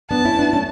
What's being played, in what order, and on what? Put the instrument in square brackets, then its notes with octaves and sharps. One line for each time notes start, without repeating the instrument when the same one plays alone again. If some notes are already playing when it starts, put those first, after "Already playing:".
[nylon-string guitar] B3 D4 [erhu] A5
[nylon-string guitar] C#4 E4
B3 D4
A3 C#4